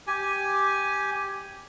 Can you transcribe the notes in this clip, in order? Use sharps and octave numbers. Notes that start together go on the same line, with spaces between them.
G4 G#5